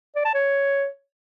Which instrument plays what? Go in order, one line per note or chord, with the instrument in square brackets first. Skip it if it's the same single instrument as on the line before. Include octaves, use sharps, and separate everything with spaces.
[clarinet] D5
A5
C#5